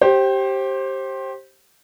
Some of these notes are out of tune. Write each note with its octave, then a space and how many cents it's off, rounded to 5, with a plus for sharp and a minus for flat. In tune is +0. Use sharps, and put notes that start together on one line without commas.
G4 -10 C5 +25